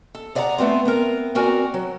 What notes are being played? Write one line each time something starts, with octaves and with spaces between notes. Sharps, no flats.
A4
G#4 D5 D#5 F5 F#5 A#5
A3 B3 C4 F4
B3 C4 A#4
C4 F#4 A#4 D5 G#5
F#3